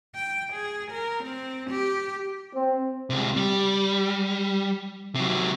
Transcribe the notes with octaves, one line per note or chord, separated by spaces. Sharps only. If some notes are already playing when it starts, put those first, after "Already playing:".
G5
G#4
A#4
C4
G4
C4
C#2 C3
G3
C3 F#3